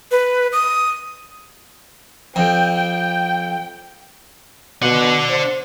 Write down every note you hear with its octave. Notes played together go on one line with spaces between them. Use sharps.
B4
D#6
F2 G5
G5
B2 D4 F#5
C5